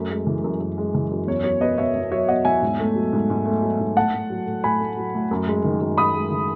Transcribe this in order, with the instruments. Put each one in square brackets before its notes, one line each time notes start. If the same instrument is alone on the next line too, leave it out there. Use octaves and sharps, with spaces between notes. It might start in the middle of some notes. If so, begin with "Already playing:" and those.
Already playing: [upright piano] F#2 A3
G#3
E3
F#2
F#2
G#3
E3
F#2
E2 C#5
F#3 C#5
B2 B4 D#5
E2 C#5 E5
E2
F#3 C#5 E5
B2 D#5 F#5
E2 E5 G#5
G#2
A3
F#3
G#2
G#2
A3
F#3
G#2
A2 F#5 A5
A3
F#3
A2
A2 G#5 B5
A3
F#3
A2
F#2
G#3
D#3
F#2
F#2 B5 D#6
G#3
D#3